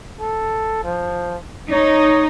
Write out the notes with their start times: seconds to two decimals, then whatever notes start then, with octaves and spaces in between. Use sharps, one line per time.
0.20 A4
0.84 F3
1.71 D#4 C#5